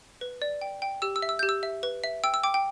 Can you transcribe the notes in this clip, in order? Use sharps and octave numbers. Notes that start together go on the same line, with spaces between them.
B4
D5
G5
G5
G4 E6
E6
E5
E6
G4 G6
E6
E5
B4
E5
G5 E6
E6
G5 D6
G5